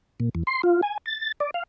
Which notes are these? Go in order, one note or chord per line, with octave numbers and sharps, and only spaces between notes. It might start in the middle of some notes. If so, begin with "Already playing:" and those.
A#2
E2
C6
F4
G#5
A6
D5
F5